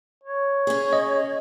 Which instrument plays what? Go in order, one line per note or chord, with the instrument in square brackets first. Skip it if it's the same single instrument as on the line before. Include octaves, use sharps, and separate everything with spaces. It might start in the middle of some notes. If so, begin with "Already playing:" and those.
[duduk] C#5
[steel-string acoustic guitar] C#4 G#4
[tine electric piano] D#5